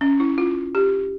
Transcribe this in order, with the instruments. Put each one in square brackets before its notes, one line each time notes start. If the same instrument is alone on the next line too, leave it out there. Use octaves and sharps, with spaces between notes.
[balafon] C#4
E4
F4
G4